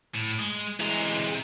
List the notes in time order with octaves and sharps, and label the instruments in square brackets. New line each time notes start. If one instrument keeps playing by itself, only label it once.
[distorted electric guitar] A2
G#3
[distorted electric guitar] C3 A#5 [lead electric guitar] E3 G#3